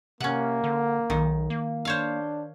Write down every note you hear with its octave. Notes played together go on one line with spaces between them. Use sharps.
C3 A#3 C#4 F#5
D3
B1 D#3
A#3
D4 C5 C#5 F5